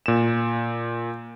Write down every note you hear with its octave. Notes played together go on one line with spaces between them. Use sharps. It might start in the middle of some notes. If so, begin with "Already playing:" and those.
A#2 E7